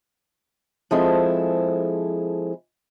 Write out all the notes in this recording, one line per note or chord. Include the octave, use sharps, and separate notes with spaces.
F3 G#3 C4 E4 G#4 A4